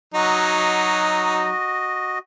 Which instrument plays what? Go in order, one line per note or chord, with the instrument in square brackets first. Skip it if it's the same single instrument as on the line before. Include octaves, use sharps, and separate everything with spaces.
[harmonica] F#3 D#4 [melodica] F#4 D#5